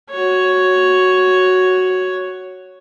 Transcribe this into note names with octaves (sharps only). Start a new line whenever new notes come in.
F#4 C#5